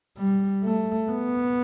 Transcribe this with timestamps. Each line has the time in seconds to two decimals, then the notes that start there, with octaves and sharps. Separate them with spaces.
0.17 G3
0.64 A3
1.11 B3